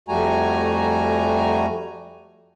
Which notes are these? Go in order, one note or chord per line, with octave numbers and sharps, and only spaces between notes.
F2 G3 A3 F#4 G#5 A#5